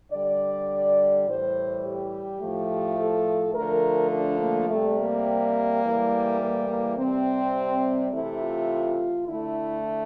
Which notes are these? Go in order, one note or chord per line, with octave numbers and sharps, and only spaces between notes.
D3 G3 D5
A2 E3 G3 C5
G4
A2 F3 A3
A4
D3 F3 A3 A#4
D4
A#3
C3 G3 A3
A#3
A2 E3 G3
A#3
A#3
C3 G3 C4
C3 E3 A3 E4
F4
D3 A3 E4